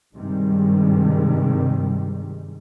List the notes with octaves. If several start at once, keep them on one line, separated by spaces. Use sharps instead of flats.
G2 C3 D#3 G3 G#3